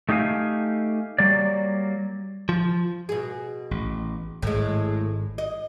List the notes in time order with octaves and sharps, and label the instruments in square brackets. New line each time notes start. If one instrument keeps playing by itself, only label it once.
[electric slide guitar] A3 D#4 G4 G#4 F5 G#5
F#3 G3 A#3 D5
[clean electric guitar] F3
[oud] B2 G#4
[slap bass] A1
[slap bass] G#1 [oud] A2 G#3
[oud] D#5